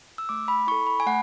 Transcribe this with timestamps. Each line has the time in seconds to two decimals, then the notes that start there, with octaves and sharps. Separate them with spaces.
0.18 E6
0.29 A3 D6
0.48 B5
0.67 E4 C#6
0.72 A4
0.87 B5
1.00 G#5
1.06 A3 F#5